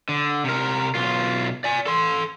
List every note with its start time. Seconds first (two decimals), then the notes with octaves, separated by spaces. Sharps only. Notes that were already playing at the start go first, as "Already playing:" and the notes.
0.09 D3
0.44 C3 A#4
0.95 B1 F4
1.64 D5 G#5
1.86 A4 C6